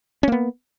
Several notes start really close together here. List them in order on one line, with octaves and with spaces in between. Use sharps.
C#4 A#3 B3